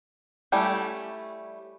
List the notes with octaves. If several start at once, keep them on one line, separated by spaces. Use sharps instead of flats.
G3 A3 C#4 E4 G4